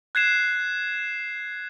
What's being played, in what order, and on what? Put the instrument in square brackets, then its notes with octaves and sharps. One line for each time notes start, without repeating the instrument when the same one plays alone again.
[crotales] F#6 G#6 C7 E7